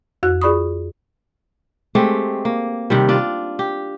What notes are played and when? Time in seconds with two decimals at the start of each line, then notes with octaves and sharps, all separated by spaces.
0.23 F2 F#4 F#6
0.42 F4 G#4 D5 B5 C#6 D#6
1.95 G#3 A3 C4 G4
2.45 A#3
2.90 C3 D#3 G3
3.09 D4 F4 D5
3.59 G4